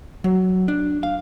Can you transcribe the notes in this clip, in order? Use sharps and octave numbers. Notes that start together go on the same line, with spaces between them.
F#3
D4
F5